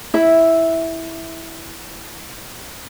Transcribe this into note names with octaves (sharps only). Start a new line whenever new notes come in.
E4 E5